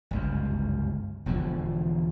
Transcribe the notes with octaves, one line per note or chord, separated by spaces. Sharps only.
G1 C#2 F#2
E1 E2 D3 F3